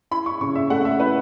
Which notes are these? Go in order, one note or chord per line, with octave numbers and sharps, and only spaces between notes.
E4 B5
C#6
C#3 C#6
E5
A3 F#5
E5
E4 B4